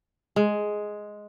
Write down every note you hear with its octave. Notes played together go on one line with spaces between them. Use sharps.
G#3